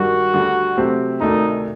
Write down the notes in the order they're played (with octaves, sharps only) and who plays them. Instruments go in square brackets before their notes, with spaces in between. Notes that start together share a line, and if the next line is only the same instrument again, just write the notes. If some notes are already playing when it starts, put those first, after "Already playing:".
Already playing: [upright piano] G2 D#3 G3 [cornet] F#4
[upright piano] D2 D3 G3
C3 F#3 A3 C4 G4
[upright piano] D2 C3 D#3 A3 D4 [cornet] D#4